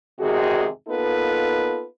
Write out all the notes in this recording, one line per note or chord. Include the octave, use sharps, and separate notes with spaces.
E2 G#2 C3 D#3 F#4 G#4
A#3 B3 D#4 F4 A4 B4